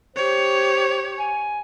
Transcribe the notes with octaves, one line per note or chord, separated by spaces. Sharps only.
G4 C5 C#5
G#5